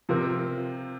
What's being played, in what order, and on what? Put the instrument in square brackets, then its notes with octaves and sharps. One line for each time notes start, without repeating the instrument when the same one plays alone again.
[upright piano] C3 F3 C4 F4 A#4